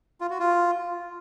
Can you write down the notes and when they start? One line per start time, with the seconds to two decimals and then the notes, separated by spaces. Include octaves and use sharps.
0.21 F4
0.30 F#4
0.40 F4